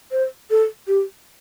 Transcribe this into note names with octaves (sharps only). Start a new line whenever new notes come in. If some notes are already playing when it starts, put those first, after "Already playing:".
C5
A4
G4